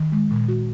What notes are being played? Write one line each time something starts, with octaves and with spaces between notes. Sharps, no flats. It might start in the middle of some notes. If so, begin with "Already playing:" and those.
Already playing: D#3
G#3
A#2
F#4